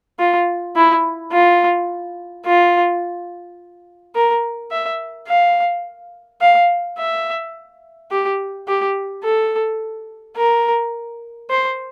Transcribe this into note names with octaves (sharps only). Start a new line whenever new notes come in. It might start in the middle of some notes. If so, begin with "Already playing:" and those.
F4
E4
F4
F4
A#4
E5
F5
F5
E5
G4
G4
A4
A#4
C5